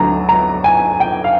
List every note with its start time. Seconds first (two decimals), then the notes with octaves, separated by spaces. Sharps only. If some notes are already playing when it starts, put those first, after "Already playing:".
Already playing: D2 D3 F#3 A#5
0.29 A#5
0.64 G#5
1.00 G5
1.24 F5